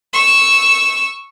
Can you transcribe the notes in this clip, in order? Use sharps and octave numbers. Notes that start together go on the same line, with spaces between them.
C#6 E6